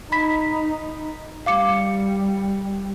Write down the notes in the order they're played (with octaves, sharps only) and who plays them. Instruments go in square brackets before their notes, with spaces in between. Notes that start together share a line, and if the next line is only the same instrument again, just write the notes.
[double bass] D#4 [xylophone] B5 B6
[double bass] G3 [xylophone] F5 D6 C#7